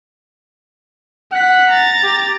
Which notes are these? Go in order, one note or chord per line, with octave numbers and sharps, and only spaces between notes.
F#5 F#6 B6
A#5 A6
G4